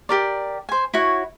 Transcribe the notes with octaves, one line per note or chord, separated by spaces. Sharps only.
G4 A#4 D5
C5 G#5
E4 F#4 C#5